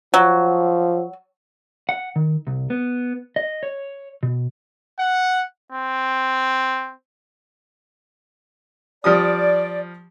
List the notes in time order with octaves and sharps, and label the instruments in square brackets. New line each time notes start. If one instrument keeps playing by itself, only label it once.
[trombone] F3 [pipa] F#3
[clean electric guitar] F#5
D#3
C2
B3
D#5
C#5
B2
[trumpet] F#5
C4
[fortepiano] F3 G3 D#6 [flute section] D5